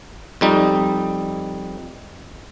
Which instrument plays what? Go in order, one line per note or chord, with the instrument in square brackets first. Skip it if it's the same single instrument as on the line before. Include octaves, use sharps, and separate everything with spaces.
[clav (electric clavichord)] F2 G3 D#4